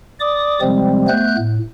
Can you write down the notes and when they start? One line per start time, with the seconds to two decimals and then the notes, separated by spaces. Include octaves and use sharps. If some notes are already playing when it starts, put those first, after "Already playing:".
0.20 D5 D6 D#6
0.61 C3 F3 G3 G#3 C4
1.08 A3 B3 F#6 G6
1.38 A2